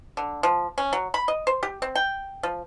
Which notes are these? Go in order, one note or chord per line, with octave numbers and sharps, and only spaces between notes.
D3
F3
C#4
F#3
B5
D#5
C5
G4
C4
G5
F3